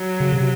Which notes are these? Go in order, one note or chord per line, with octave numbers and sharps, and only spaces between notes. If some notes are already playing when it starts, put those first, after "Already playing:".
Already playing: F#3
C#3
C3